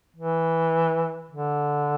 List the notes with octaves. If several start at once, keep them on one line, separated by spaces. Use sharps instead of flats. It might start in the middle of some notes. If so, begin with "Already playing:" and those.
E3
D3